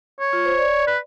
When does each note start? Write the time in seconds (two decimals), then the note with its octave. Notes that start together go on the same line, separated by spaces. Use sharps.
0.20 C#5
0.33 F4
0.45 C5
0.58 D5
0.87 B4